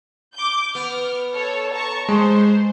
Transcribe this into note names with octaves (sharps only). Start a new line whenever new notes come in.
D6 G6
B3 F6
A4 C#5
A5 A#5 C#6
G#3 C5